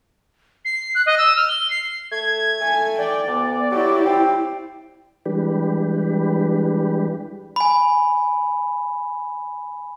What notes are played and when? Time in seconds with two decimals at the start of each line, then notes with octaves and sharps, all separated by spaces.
0.65 C7
0.95 F#6
1.06 D#5
1.18 E6
1.36 F6
1.49 G7
1.70 C7
2.11 A3 G#6
2.61 A3 G#5
2.98 D5 G5
3.27 D2 B3
3.72 F#3 E4 G4
4.06 C4
5.26 E3 G3 G#3 D4 G4 B4
7.56 G#5 B5